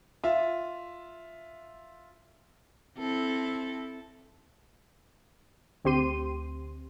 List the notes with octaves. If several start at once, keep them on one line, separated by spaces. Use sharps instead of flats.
F4 E5
C4 E4 A4
D2 C4 G4 C6 D#7